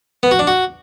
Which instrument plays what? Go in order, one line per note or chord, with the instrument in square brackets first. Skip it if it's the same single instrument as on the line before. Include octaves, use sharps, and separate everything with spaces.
[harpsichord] B3
F#4
D4
F#4